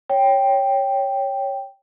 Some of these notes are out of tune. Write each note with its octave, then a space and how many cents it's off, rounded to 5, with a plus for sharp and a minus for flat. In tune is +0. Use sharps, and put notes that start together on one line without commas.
C#5 +0 G5 +0